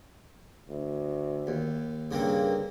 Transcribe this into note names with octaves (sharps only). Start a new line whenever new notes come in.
D2
D#2
G2 C#3 A#3 C4